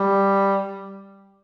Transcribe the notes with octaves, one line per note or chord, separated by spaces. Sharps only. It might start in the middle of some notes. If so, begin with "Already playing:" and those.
Already playing: G3